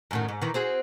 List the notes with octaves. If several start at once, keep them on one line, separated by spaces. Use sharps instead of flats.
F#2 A2 D#3
G#2
D#3 E3
C4 F#4 G#4